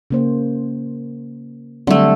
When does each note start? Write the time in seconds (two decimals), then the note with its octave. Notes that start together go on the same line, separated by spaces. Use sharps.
0.11 C#3 A#3 C5
1.87 D3 F#3 G3 A3 C4